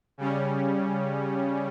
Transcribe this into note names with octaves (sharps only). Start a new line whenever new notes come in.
C#3 G3 C#4